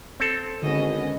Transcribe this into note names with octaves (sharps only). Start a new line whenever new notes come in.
C4 A4
G#1 D3 B3 C#4 D#5